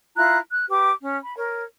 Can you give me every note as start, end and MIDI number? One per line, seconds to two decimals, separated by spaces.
0.16 0.38 64
0.16 0.38 65
0.16 0.38 82
0.16 0.38 90
0.51 0.64 90
0.69 0.91 67
0.69 0.91 71
0.69 0.91 86
1.01 1.18 61
1.22 1.36 83
1.36 1.62 70
1.36 1.62 73